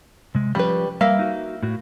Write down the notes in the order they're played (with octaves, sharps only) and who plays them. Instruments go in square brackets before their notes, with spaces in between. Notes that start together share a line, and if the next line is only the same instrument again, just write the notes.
[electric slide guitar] C3 G#3
[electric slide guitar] F3 C#4 G4 [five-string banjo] G3 B4
[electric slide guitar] G3 [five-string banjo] A#3 E5 F5
[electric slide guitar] D#4 F#4
A2 F#4